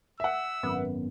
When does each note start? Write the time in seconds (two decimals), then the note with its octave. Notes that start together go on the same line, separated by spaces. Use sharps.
0.20 E5 F#5 E6
0.63 G#1 F#2 B3